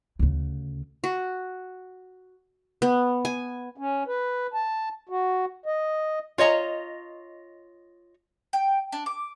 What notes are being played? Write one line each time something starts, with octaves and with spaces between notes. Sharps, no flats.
D2 C#3
F#4
B3
G#5
C#4
B4
A5
F#4
D#5
F4 C#5 D#5 A#5
G5
D4
D6